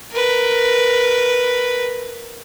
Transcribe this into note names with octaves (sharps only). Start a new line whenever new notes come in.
A#4 B4